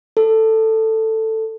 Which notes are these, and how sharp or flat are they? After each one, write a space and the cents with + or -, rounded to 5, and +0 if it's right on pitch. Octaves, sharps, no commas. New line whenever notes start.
A4 +10